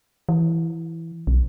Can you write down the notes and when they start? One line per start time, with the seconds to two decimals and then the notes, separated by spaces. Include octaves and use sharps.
0.29 E3
1.27 B1